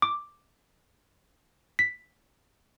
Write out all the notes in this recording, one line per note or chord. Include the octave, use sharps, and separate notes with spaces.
D6
B6